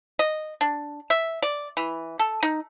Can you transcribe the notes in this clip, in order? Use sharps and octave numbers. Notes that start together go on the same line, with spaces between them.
D#5
D4
E5
D5
E3
A4
D#4